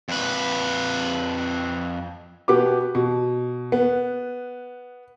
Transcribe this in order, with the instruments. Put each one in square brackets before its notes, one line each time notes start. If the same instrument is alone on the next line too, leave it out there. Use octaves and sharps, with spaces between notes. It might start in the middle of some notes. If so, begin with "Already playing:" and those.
[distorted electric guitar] F2 B4
[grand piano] B2 B3 G4 D6
B2
B3